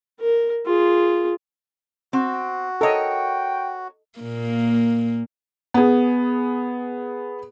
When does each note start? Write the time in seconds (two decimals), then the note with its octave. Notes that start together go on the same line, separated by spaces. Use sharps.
0.20 A#4
0.66 F4 G#4
2.13 C4 F#4
2.81 A4 A#4 C#5 D#5 G5
4.19 A#2 A#3
5.74 B3 G#4